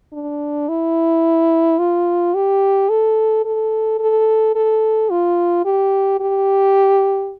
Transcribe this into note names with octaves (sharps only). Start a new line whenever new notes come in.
D4
E4
F4
G4
A4
A4
A4
A4
F4
G4
G4